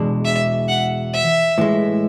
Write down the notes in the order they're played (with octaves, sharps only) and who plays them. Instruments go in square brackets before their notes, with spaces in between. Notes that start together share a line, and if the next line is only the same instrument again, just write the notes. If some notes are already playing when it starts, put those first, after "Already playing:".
Already playing: [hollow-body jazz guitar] E2 B2 G#3 D4
[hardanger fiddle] E5
F#5
E5
[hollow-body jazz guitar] A2 E3 G#3